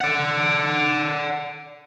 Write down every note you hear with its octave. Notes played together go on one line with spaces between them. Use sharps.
D5 F#5